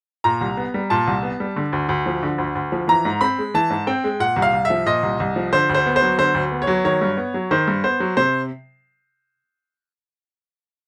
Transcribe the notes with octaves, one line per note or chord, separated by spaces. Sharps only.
A#2 A#5
C2
B3
G3
A#2 A5
C2
B3
G3
D3
D2
D2
F3
D3
D2
D2
F3
E3 A#5
G#2
C4 B5
G#3
E3 A5
G#2
C4 G5
G#3
A#2 F#5
C2
F5
C2
E5
F3
A#2 D#5
C2
C2
F3
D3 C5
D2
C5
B3
C5
F#3
D3 C5
D2
B3
C#5
F#3
D#3 C#5
G2
B3
F#3
D#3 C5
G2
B3 C5
F#3
C3 C5